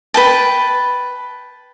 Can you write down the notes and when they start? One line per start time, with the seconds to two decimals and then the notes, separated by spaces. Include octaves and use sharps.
0.14 B4 G5 A5